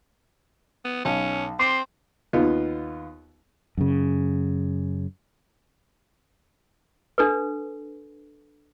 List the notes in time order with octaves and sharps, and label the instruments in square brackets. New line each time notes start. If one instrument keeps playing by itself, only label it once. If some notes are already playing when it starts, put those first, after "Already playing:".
[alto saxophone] B3
[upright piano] B1 [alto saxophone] C#4
[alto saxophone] C4 [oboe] C6 [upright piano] D6
[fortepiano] D#2 B3 F4
[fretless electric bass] F#2 C#3
[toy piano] D4 A4 B4